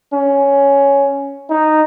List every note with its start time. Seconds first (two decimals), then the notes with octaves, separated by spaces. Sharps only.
0.14 C#4
1.50 D#4